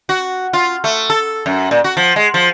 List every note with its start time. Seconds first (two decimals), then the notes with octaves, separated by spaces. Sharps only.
0.09 F#4
0.53 F4
0.84 A3
1.10 A4
1.46 F#2
1.71 A#2
1.84 F#4
1.97 F3
2.16 G#3
2.34 F3